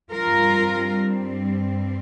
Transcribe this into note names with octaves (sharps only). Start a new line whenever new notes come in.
G2 G3 C4 F4 A#4